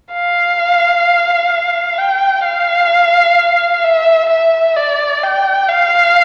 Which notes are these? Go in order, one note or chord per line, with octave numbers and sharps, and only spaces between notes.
F5
G5
F5
E5
E5
D5
G5
F5